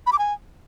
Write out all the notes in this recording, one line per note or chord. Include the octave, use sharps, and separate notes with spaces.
B5
D6
G#5